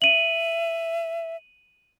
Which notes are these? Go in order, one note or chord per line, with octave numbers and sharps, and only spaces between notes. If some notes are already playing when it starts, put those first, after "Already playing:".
E5 D#7 F#7